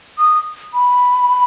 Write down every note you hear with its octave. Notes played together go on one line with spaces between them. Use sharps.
D#6
B5